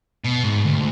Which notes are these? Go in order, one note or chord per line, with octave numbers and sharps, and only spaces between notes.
B2
G#2
D2